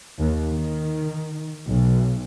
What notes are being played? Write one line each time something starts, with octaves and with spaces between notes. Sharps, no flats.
D#2
D#3
B1